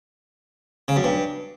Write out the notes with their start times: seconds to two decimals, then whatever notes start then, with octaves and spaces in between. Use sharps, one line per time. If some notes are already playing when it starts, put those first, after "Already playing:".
0.88 C#3
0.96 F#2
1.04 G2